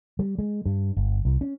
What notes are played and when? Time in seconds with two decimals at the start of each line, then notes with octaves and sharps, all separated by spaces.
0.19 G3
0.39 G#3
0.66 G2
0.97 G1
1.25 C2
1.41 C#4